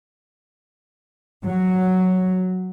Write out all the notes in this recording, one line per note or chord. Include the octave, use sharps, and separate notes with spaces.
F#3